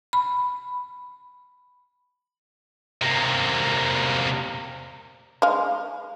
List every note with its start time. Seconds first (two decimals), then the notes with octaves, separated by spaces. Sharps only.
0.13 B5
3.02 C3 A#3
5.42 G#3 F5